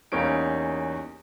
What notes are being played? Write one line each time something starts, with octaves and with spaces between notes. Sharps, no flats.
E2 G3 A#3 C#4 D#4 D7